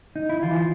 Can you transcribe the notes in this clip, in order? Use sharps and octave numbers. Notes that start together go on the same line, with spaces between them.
D#4
E4
E3 F4